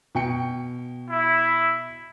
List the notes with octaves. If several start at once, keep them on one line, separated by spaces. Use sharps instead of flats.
B2 G5 C#7
E4